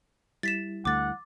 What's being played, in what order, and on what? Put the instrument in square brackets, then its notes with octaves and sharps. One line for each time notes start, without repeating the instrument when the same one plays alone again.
[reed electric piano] G3 E4 [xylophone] A6 B6 E7
[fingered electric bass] D2 A3 [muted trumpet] F#5 [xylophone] D6 A6